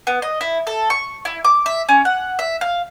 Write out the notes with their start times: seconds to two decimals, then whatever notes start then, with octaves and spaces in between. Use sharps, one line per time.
0.07 B3
0.22 D#5
0.41 E4
0.67 A4
0.90 C#6
1.25 E4
1.44 D6
1.66 E5
1.89 C#4
2.05 F#5
2.39 E5
2.61 F5